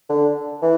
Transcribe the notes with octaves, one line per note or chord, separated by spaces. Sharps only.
D3
E3